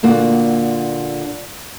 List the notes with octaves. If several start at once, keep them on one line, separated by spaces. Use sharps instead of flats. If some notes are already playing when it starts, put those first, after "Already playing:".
A#2 D3 A#3 F#4